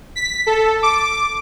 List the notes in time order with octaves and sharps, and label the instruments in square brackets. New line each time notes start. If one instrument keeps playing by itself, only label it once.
[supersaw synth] B6
A4
D6